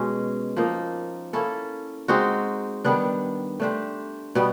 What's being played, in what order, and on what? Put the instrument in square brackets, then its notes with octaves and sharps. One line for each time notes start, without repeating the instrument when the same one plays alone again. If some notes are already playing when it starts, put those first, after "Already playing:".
Already playing: [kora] B2 G#3 C#4
F3 A#3 D#4
A#3 C#4 E4 A4
G#3 C4 D#4 F#4
D#3 G3 B3 D4
A3 D4 G4 C5
B2 G3 B3